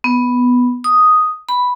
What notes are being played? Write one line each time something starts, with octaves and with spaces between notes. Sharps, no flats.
B3
D#6
B5